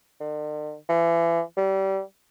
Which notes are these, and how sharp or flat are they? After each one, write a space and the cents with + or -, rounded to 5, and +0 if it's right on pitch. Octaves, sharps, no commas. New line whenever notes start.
D3 +45
E3 +35
G3 -25